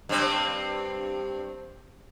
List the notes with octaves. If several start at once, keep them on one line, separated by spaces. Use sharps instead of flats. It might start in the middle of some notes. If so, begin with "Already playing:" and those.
G2 C4